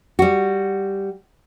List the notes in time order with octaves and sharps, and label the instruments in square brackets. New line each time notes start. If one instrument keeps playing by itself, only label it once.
[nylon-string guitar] G3 F#4